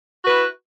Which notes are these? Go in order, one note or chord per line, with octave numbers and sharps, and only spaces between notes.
E4 F#4 B4